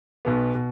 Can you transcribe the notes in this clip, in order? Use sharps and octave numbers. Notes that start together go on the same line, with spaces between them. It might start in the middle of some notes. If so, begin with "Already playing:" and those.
B1 B2 B3
B2